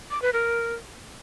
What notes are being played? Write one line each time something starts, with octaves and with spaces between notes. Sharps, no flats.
D6
B4
A#4